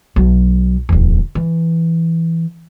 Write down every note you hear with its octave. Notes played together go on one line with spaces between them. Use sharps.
B1 F#3
D1 E2
E3